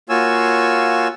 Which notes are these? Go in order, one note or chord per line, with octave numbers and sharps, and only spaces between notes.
A#3 F4 F#4 C#5 G#5 E6